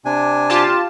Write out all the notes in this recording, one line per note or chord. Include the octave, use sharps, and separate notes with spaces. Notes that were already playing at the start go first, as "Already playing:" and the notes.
C3 D4 G#5
F4 G4 A5